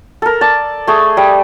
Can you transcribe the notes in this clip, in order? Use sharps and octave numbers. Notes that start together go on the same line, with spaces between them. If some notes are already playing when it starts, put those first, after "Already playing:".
A4 A#4
D5 A5
A3 G#4
G3